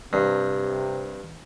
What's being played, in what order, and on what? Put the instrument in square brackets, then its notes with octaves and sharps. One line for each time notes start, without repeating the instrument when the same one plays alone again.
[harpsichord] G2 [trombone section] C3